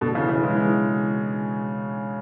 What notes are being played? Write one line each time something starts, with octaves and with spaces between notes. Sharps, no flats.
B2 D3
C#3 E3
C#3 E3
E3 G#3
E3 G#3